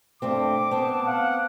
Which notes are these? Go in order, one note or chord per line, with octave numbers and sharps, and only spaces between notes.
G2 A3 C4 D6
B3 C4 A5
F5 F#5